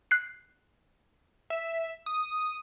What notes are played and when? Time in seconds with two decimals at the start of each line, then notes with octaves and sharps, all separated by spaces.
0.11 F#6 C7
1.50 E5
2.06 D#6